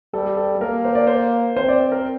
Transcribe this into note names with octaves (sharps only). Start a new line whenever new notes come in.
G3 A4
G4
A4
A4
A#3 A#4
C5
D5
C5
C4 C5
D5
C5
A#4